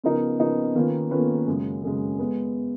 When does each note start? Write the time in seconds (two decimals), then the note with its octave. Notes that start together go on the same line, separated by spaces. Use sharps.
0.04 C#3 F3 B3 D#4 A#4
0.39 C#3 F3 B3 D#4 A#4
0.75 D#3 A#3 C#4 F4 B4
1.11 D#3 A#3 C#4 F4 B4
1.47 F#2 C#3 G#3
1.83 F#2 C#3 G#3
2.19 G#3 B3